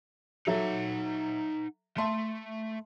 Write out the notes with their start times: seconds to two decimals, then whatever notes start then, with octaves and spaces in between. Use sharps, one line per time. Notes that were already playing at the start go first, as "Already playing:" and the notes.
0.47 F#3 D#4 A4 E5 F#5
1.98 A3 E5 A5 C6